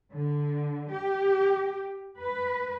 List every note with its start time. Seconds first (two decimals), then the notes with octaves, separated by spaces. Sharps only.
0.12 D3
0.89 G4
2.20 B4